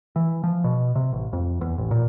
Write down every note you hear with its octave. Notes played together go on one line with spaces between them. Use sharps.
E3
F3
B2
C3
A1
F2
E2
A1
A#2